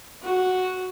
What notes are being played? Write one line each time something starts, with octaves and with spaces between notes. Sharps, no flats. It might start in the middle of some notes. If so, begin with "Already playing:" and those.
F#4